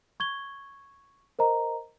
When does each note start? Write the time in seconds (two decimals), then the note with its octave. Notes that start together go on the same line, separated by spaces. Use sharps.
0.20 C#6 G#6 G7
1.39 A#4 C5 D#5 A#5